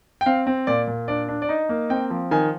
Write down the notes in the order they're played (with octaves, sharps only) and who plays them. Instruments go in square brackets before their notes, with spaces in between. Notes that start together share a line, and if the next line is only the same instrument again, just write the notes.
[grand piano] G5
C4 F5
C4
A#2 D5
A#2
D4 D5
D4
D5
D#4 D#5
A#3
C4 G5
F3
D#3 G#5